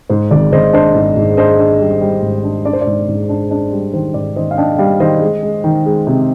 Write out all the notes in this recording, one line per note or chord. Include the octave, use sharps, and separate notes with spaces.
G#2 C5
G#1 D5
G#1 C5 D#5
D4 C5 D#5
G#2
G#2
D4 C5 D#5
D4
G3
G3
G#2
D4
D4 D5
C5
D5
G#2
G#2
D4
D4
G3
D#3 C5
G#2 D5
D#3 C5 D#5
F5
D4 D#5 G5
G3 D5 F5
D#3 C5 D#5
G#3
G#3
D#3
G#3
C3